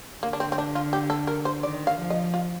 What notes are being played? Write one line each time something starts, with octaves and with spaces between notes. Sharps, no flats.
D3 A#3
D4
C4
C4
D4
F4
G4
A4
A#4
C5
D#3 D5
F5
F3
D#5
F4